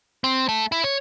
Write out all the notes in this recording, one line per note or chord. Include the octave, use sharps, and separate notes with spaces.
C4
A3
E4
C#5